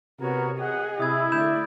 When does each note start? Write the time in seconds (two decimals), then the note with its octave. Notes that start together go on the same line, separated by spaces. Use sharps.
0.20 C3 B3 F#4 A#4 C#5
0.59 G#4 D#5 F#5
1.00 C3 E4 D#6 G#6
1.32 D3 A3 D5 B5 G6 E7